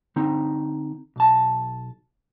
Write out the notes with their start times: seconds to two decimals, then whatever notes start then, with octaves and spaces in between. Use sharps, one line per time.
0.16 D3 C4 D#4
1.16 B1 A5